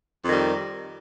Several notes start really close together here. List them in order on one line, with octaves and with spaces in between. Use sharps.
F2 D#3 G3